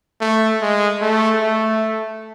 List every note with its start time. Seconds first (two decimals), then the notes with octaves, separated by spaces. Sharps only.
0.21 A3
0.61 G#3
1.01 A3
1.41 A3